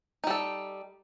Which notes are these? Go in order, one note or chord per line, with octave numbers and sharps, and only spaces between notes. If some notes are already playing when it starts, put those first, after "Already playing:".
G3 D#4 A4